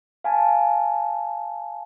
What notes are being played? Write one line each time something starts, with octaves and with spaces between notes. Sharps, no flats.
F5 G#5 A5